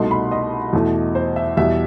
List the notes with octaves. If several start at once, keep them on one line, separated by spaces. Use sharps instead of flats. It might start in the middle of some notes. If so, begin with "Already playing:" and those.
Already playing: C2 B2 A3 D#4 C6
B5
D#5
E2 B2 A3 E4
C5
E5
E2 B2 G3 E5